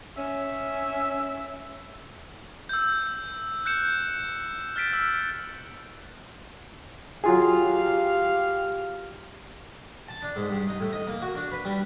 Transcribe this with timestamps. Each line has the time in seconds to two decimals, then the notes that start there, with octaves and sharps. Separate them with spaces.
0.18 C#4 E5
2.69 E6 G6
3.65 F#6 G6 C#7 E7
4.76 F6 A6 B6 D7
4.93 E6 B6
7.24 F#3 F4 G4 G#4 F5
10.09 A5
10.22 D4
10.36 G#2
10.50 G2
10.68 D#4
10.80 A2
10.93 D#5
11.07 A#3
11.22 F#4
11.35 D4
11.52 B4
11.65 G3